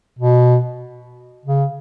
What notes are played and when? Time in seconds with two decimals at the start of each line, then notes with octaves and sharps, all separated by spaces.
0.18 B2
1.45 C#3